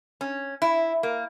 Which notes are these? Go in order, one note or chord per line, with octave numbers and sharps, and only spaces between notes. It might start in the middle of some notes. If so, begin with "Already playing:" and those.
C#4
E4
A#3